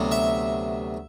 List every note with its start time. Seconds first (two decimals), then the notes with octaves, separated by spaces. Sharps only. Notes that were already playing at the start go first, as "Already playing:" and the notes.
Already playing: D2 C3 F#3 B3
0.12 E5